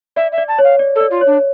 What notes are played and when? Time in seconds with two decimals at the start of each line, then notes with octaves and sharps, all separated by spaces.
0.16 D5 E5
0.32 E5
0.38 D5
0.48 A5
0.59 C#5
0.64 F5
0.79 D5
0.95 A4 D5
1.11 F4
1.21 C#5
1.26 D4